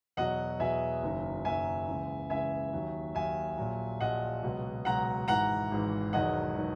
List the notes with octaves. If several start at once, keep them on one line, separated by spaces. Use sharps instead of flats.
E2 B2 F#3 D#5 F#5
E2 B2 F#3 E5 G#5
F#1 F#2 D#3 F#3
F#1 F#2 D#3 F#3 E5 G#5
C#2 C#3 E3
C#2 C#3 E3 E5 G#5
D#2 D#3 F#3
D#2 D#3 F#3 E5 G#5
A#1 A#2 F#3
A#1 A#2 F#3 D#5 F#5
C#2 B2 F#3
C#2 B2 F#3 F#5 A#5
G#1 G#2 E3 F#5 A#5
G#1 G#2 E3
E1 E2 D#3 F#3 D#5 F#5
D#3 F#3